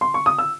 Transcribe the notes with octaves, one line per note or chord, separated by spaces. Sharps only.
C6
C#6
D#6
E6